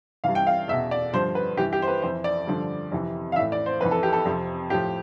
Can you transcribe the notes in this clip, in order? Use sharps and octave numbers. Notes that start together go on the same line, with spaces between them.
G2 E3 F5
G5
F5
E2 B2 E5
D5
G2 D3 F3 C5
B4
G2 E3 G4
G4
C5
B4
F2 E3 C5
D5
G2 D3 F3
F2 C3 E3
F5
A2 E3 E5
D5
C5
F2 E3 B4
A4
G4
A4
F2 C3 F3
A2 F3 G4